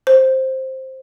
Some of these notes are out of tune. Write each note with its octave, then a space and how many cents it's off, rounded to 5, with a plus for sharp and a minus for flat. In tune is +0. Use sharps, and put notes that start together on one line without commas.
C5 +10